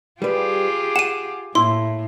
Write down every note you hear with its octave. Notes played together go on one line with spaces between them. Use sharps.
G3 F4 G4 G#4 B4
F#5 D#7 E7
A2 A#3 E4 C6